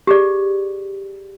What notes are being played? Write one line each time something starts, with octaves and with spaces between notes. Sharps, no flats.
G4 G#4 D5